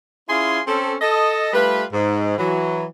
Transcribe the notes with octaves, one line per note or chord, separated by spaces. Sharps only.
C#4 E4 F4 G#4 G#5 C6
C4 C#4 A4
A4 D#5
G3 A3 F4 B4
G#2
E3 F#3